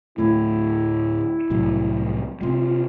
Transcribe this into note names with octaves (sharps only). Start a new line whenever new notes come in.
D2 A2 A3 E4
C2 A2 F#3
C3 G#3 F4